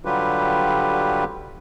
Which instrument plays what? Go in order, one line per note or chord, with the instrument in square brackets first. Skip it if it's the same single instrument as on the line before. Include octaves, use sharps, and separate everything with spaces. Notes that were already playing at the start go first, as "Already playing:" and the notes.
[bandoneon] D3 F#3 G3 F4 G4 B4